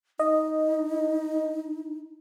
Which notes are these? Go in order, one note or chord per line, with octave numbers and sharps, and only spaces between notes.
D#4 D#5